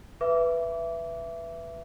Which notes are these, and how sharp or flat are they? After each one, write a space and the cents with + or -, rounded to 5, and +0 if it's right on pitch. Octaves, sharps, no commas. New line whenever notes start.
B4 +0 E5 +20 D6 -25